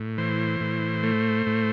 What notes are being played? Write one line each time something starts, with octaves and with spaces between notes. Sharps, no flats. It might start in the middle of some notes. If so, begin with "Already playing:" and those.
Already playing: A2
E3 C5
A2
A3
A2